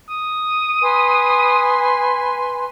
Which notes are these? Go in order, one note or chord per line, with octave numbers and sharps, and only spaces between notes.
D#6
B4 G#5 C6